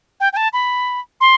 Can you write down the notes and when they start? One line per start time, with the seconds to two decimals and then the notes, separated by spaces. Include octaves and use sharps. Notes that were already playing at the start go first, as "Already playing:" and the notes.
0.20 G5
0.33 G5
0.37 A5
0.53 B5
1.21 C6